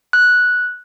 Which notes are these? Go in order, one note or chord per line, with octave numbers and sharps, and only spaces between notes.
F#6